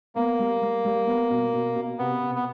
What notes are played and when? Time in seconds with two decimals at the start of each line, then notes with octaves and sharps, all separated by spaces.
0.15 A#3 B3
0.39 G3
0.62 G3
0.85 G3
1.07 B3
1.30 B2
1.54 B2
1.76 B2
1.99 C3 B3
2.22 C3
2.35 B3